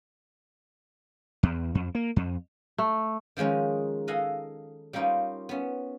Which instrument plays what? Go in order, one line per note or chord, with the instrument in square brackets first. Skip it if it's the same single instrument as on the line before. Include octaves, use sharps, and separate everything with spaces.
[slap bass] E2
F2
A#3
F2
[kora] A3
[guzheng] D#3 F3 G#3 C#4 D#4
A4 D#5 F5 F#5 G#5 A#5
G3 A#3 C#4 D#4 F4
B3 C#4